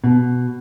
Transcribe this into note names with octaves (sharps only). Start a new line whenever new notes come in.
B2